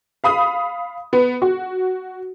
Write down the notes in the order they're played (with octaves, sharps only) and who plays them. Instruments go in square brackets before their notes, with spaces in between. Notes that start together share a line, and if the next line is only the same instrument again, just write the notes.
[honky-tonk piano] F5 B5 D#6
B3
F#4